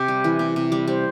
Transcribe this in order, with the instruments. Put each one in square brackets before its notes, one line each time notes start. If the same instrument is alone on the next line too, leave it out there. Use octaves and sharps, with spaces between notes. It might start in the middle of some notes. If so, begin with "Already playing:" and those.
Already playing: [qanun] C3 [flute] G4
[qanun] G3
E3
C3
C3
G3
[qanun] G3 [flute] C5